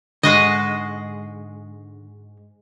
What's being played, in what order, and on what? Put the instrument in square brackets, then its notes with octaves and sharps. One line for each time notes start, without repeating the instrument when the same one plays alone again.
[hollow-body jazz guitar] G#2 [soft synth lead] D3 [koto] G#3 F#4 D#5